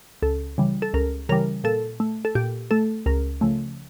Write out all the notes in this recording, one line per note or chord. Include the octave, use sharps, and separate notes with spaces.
C#2 A4
C#3 E3 G3
A4
C#2 A#4
C#3 E3 G3 A#4
A#2 A4
A3
A4
A#2 G4
A3 A4
C#2 A#4
C#3 F3 A3